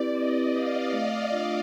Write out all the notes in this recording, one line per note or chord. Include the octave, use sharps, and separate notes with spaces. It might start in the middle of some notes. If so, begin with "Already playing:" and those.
Already playing: C4 E4 G4 B4 D5
C4 D#5
E4 G4 B4 F5
A3
D4 F4